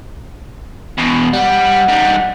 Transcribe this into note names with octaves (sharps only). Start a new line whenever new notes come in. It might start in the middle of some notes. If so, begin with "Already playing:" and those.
E2 B2
G3 F#5
G3 D#4